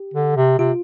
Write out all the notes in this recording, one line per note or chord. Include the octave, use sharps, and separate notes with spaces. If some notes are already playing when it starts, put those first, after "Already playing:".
Already playing: G4
D3
C3
C3 F4